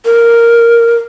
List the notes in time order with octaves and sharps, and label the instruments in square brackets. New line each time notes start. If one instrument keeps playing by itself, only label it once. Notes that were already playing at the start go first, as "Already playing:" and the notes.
[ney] A#4